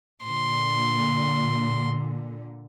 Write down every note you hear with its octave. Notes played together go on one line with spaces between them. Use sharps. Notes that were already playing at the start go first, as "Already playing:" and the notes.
A#2 D3 C6